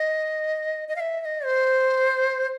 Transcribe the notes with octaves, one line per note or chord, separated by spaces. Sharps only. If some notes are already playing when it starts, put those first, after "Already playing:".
Already playing: D#5
D#5
F5
E5
E5
D#5
C5